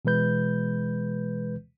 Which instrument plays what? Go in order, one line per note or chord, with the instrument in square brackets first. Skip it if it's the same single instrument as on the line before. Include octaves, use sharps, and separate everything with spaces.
[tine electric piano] B2 E3 G#3 B4 G6